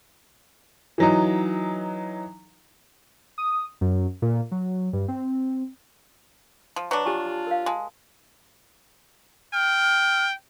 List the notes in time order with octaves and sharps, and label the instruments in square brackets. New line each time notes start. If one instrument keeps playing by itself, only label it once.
[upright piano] E3 F#3 D#4
[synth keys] D#6
F#2
A#2
F#3
G2
C4
[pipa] F3
[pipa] F#3 D4 [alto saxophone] B4
[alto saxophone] F4 [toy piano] G4 G#5 C#6
[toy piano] A5
A#4 F5
[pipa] G#3 [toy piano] G#5 A5
[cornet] G5 [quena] F6